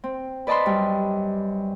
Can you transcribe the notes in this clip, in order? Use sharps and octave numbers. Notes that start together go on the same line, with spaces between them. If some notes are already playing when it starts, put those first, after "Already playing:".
C4
B4 D5 D#5 A5 B5 C6
F#2 G3